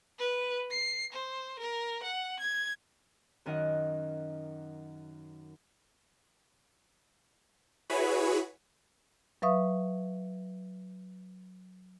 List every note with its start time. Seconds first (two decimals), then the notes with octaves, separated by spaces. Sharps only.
0.19 B4
0.71 C7
1.13 C5
1.60 A#4
2.03 F#5
2.40 G#6
3.46 F#2 D#3 D#5 F#5 F#6
7.90 E4 F#4 G#4 B4 C#5 B5
9.42 F#3 B4 E5 F5 C#6 D#6